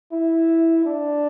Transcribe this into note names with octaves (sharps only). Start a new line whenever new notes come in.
E4
D4